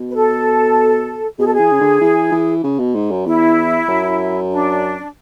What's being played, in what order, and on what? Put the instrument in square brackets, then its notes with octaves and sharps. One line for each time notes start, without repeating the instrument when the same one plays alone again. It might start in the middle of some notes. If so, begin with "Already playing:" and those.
Already playing: [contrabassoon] B2
[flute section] B4
A4
[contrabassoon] B2 [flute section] G#4
[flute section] A4
G#4
[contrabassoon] E3
C#3
D3
E3
E3
C#3
B2
G#2
F#2
[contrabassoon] E2 [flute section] E4
[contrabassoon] F#2
[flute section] D4